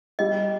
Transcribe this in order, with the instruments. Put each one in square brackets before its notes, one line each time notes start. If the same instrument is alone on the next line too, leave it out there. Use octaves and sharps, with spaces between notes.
[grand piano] G3 [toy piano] D#5